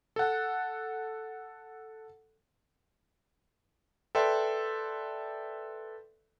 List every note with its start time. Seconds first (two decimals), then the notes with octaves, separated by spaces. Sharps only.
0.16 A4 F#5
4.15 A4 B4 D5 E5 G5 C6